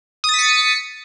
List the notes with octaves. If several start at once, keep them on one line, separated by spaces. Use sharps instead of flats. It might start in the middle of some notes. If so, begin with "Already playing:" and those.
D#6 A6 B6 C#7